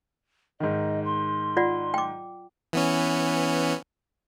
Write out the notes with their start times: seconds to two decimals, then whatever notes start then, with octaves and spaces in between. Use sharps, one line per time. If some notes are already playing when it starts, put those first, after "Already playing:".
0.60 G#2 D#3 D#5
1.04 C6
1.57 F4 D5 F#5
1.94 G5 D6
2.73 E3 B3 C#4